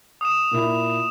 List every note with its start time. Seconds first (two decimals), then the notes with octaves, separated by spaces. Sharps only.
0.21 D#6 E7
0.51 A#2 A#3 E4